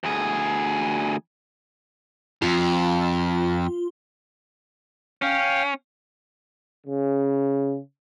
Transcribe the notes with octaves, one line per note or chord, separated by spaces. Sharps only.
D2 G#4
F2 F4
C#4 F5 G5
C#3